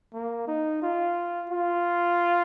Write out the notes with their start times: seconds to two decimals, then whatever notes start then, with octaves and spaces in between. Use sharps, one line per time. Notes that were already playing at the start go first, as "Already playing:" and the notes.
0.14 A#3
0.48 D#4
0.82 F4
1.50 F4